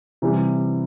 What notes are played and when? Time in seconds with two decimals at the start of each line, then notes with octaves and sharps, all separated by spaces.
0.22 C3 E3 G3